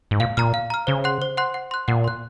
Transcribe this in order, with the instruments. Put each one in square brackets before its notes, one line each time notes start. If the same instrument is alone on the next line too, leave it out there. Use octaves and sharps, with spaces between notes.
[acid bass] G#2
[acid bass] A#2 [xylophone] F5
[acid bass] A#2 [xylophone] A#5 F6
[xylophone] F5
A#5 F6
[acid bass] C#3 [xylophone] C5
[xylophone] F#5 C6 F#6
C5
F#5 C6 F#6
F#5
C6 F#6
[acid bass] A#2 [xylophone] F#5
[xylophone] C6 F#6